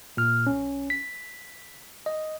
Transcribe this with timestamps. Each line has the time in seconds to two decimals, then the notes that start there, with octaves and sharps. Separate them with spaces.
0.17 A#2 F6
0.47 B1 C#4
0.90 B6
2.06 D#5